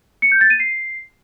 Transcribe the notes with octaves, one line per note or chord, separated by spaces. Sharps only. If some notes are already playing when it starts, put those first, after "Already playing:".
C#7
G6
A6
D#7
C7